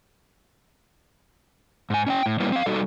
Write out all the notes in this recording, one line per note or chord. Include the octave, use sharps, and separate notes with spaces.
G#2 G#5
C#4 D4 G5
A2
G3 A#3 B3 C#4 E4
C4 F5
G3 D#4 F#4 A4